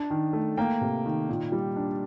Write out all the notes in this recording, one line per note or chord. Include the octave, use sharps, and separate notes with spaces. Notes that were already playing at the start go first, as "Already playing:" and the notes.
Already playing: D4 A5
D#3
A3
A#3 G5
C3
D#3
A#2
G3
D4